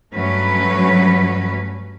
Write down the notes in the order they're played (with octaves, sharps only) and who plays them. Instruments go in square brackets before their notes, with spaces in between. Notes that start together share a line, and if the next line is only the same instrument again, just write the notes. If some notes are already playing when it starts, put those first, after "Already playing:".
[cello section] G2 F#3 A3 C#4 B4